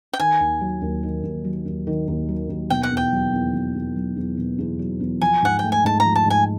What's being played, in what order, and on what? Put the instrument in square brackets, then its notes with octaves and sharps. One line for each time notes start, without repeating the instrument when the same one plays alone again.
[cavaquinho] G5
[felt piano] D#3 [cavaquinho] G#5
[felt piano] D#2
F#3
D#2
D#3
D#2
F#3
D#2
D#3
D#2
F#3
D#2
[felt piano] B2 [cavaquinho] G5
[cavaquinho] F#5
[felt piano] E2
[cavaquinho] G5
[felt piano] F#3
E2
B2
E2
F#3
E2
B2
E2
F#3
E2
[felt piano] F3 [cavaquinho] G#5
[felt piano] G#2 [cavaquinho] F#5
[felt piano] A3 [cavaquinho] G5
[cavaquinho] G#5
[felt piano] G#2 [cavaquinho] A5
[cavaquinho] A#5
[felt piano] F3
[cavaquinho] A5
[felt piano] G#2 [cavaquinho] G#5